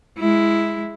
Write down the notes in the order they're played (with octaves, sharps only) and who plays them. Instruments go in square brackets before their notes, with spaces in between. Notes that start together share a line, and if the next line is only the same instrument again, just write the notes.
[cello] G#3 E4